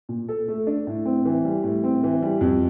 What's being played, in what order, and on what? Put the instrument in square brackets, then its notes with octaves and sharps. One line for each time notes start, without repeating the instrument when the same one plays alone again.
[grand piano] A#2
A4
A3
D4
A2
C4
E3
G3
A2
C4
E3
G3
F2